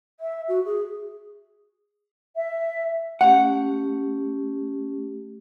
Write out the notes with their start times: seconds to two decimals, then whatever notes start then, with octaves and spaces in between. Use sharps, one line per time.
0.20 E5
0.48 F#4
0.65 G#4
2.35 E5
3.21 A3 C#4 G4 F#5